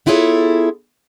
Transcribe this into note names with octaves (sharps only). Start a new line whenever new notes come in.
B3 E4 F4 G#4 A4 C#5